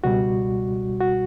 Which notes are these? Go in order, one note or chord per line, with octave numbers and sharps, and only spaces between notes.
C#2 B2 G3 F#4
F#4